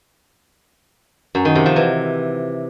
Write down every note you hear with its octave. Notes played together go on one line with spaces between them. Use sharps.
F#2
D#3
C3
F3
E3